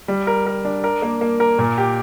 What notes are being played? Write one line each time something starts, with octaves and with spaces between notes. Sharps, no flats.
G3
A#4
A#4
D4
A#4
A#3
A#3
A#4
A#2
G4